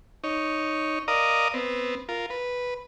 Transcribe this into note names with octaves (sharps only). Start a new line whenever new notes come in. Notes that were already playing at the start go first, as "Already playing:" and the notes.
D#4 C#5
A#4 D5 D#5 F5 A#5 D#6
B3 C4
F4 A#4
B4